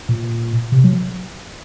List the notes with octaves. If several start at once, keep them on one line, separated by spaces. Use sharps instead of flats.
A#2
C3
F#3